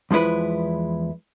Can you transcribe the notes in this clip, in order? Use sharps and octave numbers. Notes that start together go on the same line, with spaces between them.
E2 F3 G#3 E4 B4